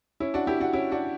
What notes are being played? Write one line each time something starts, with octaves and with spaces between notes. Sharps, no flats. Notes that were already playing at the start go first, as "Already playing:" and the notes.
C#4 E4
D4 F#4
E4 G4
D4 F#4
C#4 E4
D4 F#4